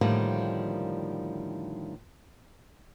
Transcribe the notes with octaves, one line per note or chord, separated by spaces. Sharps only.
A2 D3 D#3 F3 G3 A#3